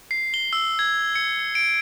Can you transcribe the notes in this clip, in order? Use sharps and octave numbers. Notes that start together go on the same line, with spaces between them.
C7
G7
E6
G#6
C#7
D7